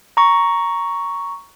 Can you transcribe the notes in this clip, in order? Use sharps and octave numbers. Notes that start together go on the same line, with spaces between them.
A#5 C#6